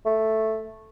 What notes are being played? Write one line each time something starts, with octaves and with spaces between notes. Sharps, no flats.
A3